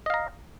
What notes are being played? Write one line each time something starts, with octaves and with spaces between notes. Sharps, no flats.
D#5 F5 A#5